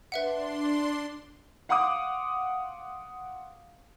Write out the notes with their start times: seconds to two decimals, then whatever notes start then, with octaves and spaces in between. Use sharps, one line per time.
0.12 D4 B4 E5 F#5 C6
1.69 F5 F#5 C6 D6 D#6